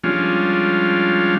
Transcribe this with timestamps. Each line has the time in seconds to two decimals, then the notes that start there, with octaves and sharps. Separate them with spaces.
0.04 F3 G3 G#3 C#4 D4 F4